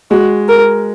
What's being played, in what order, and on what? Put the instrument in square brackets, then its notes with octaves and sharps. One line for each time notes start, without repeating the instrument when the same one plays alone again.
[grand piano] G#3 [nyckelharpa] F#4
[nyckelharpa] A#4